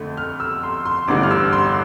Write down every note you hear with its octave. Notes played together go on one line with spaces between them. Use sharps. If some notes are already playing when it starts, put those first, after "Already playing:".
Already playing: F2 D3 A3
F6
E6
C6
C6
A1 G2 D3 A3 D6
F6
E6
C6